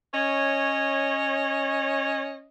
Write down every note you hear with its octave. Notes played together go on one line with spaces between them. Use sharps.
C#4 C#5 D#5